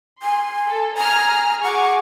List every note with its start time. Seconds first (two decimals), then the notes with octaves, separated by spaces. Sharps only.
0.22 G#5 C6
0.68 A4
0.97 G#5 A#5 F6
1.64 G#4 F#5 C#6 D6